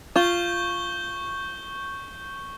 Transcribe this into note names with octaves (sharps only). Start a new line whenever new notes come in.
F4 C#6 G6 G7